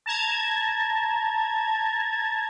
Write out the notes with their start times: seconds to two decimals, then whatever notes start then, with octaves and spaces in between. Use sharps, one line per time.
0.06 A5 A#5 G#6